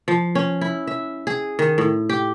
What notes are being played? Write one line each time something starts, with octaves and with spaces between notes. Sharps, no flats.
F3
C#4
E4
E5
G#4
D#3
A2
G4